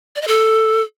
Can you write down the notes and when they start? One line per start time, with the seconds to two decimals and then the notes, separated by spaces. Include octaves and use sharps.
0.16 D5
0.22 D#5
0.28 A4